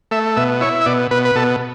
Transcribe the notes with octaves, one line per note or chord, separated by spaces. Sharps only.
A3 E5
B2 E5
E4 C#5
E5
B2 D5
B2 B4
B4
B2 A4